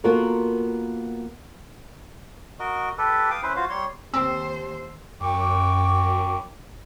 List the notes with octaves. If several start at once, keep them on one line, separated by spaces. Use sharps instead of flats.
A#3 B3 F4 F#4 A4 A#4
F#4 A#4 D#5
G4 A4 B4
F5 G5 D#6
C#4 E4 B4 C5
F4 F#4 C5 F5
G3 C#5 C6
D#2 C4 G4 C5 E6
F#2 G5 C#6 D6